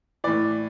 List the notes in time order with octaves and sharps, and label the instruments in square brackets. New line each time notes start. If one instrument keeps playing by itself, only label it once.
[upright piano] A2 E3 D5